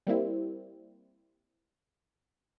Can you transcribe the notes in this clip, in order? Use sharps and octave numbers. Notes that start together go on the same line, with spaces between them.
G3 A#3 C4 E4